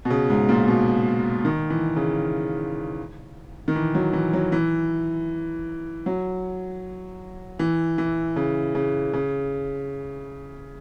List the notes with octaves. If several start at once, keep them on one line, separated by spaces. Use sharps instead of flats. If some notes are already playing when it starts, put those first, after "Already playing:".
B2
C#3
G#2
A#2
B2
D#3
E3
C#3
D#3
E3
F#3
E3
F#3
E3
F#3
E3
E3
C#3
C#3
C#3